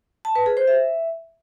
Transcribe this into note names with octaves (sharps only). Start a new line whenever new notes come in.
A5
B4
G#4
C5
E5